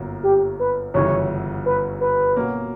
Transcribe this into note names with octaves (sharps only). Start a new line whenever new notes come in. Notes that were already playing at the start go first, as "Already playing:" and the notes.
Already playing: G1 F#2 A#3
G4
B4
G1 F#2 C#3 E3 G3 C#5
B4
B4
B2 F#3 A#3 C#4